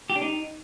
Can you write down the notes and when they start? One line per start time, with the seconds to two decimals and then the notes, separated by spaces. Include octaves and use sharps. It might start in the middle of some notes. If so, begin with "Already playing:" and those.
0.10 G4
0.16 D4
0.22 D#4